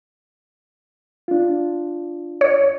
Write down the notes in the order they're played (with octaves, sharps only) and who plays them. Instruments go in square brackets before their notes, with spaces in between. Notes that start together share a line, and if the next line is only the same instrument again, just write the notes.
[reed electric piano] D4 F4
[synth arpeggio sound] C#5